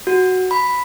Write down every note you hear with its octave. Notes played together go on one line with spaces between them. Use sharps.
F#4
B5